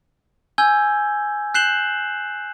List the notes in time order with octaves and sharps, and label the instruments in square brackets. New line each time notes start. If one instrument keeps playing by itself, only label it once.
[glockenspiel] G#5 E6 G6 G#6 G7
F#6 G6 C7 E7 F#7 G7